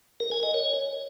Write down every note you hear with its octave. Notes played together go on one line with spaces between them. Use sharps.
A#4
G#5
D#5
C#5